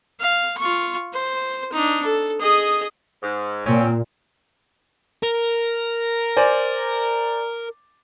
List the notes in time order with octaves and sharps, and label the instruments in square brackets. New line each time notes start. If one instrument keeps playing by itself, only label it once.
[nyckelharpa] F5
F4 C#6
C5
D4 D#4
A4
G#4 D#5
[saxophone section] G#2
[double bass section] A#2 [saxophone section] C4 C#4
[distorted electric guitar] A#4
[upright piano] C5 D5 G#5